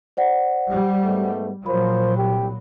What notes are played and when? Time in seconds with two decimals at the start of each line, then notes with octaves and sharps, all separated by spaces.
0.17 C5 D5 F#5
0.70 G3
1.04 G#2 A3 B3
1.66 A#2 F3 F#3 A#4 C5 B5
2.17 C2 G4